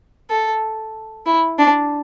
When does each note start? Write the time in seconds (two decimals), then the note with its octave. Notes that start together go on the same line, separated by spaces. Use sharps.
0.30 A4
1.26 E4
1.58 D4